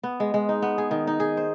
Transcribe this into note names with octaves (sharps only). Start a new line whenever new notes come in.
B3
G#3
G#3
D#4
B3
G#4
D#3
D#4
G#4
C5